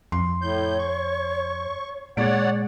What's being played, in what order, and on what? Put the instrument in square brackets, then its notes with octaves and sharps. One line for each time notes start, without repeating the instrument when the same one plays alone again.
[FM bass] F2 [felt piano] C6
[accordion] A2 G6 [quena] C#5
[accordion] C#6
[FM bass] A#2 [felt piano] G#3 A6 D7 [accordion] C#5 D5 F#5